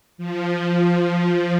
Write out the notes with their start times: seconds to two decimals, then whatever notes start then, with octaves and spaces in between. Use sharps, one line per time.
0.18 F3